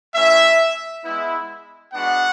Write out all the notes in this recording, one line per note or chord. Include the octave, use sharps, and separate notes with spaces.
A3 C#4 E4 E5
G#3 B3 E4
G#3 B3 D4 F#4 F#5